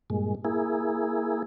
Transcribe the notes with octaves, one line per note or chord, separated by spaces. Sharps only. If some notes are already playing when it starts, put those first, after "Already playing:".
G2 A#2 G#3
A#3 E4 G#4